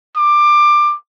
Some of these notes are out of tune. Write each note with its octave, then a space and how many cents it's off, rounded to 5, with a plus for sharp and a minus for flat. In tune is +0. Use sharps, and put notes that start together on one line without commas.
D6 +20